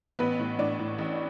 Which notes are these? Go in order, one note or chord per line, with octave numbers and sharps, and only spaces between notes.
A1 B3 B4
A2
A2 D4 D5
A2
A1